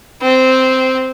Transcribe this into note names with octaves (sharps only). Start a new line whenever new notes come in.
C4